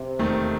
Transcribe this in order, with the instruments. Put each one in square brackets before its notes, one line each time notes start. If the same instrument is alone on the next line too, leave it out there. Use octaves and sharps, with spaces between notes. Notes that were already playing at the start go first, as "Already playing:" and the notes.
Already playing: [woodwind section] C3
[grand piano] E1 D#2 D#3 A3